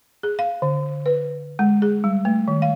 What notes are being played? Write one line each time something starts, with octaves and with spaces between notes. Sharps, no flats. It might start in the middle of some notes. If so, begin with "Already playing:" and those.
G#4
F5
D3
B4
G#3
G#4
G3
A3
D#3
F5